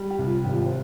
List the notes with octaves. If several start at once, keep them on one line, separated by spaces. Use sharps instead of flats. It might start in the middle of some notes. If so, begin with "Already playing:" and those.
Already playing: G3
G4
C2
F4
G#1 G4
F4
G4
C5